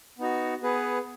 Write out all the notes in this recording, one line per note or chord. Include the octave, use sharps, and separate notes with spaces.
B3 D#4 F#4
B3 G#4 B4